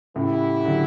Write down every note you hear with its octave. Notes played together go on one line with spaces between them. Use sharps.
A2 C#3 E3 B3 E4 G4
D3 F#3